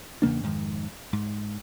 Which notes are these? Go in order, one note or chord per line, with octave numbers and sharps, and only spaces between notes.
E2 C#3 A#3 D4
F2 G#2 D#3
G#2